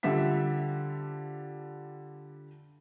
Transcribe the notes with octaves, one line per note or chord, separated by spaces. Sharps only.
D3 F3 G3 E5 B6